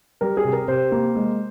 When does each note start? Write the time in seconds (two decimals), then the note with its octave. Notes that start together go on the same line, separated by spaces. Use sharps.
0.21 G3 A#4
0.37 G#4
0.44 C3
0.53 A#4
0.68 C3 C5
0.92 A#3
1.16 G#3